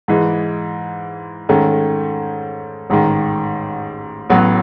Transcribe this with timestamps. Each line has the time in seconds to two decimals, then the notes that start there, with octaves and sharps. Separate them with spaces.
0.08 G#2 E3 G#3
1.49 G#2 D#3 A3 C#4
2.90 A1 G#2 D#3
4.30 A1 A2 F#3 B3 F#4